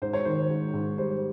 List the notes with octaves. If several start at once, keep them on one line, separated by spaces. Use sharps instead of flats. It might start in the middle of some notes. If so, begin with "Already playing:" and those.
G#2 C5
C#5
D#3 C5
G#2
G#2
G3 C5